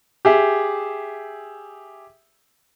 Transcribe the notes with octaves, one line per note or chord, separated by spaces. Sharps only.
G4 G#4 E5